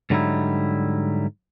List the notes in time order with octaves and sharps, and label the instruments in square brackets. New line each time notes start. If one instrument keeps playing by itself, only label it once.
[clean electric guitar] G#2 D3 F#3 G3 D#4 E4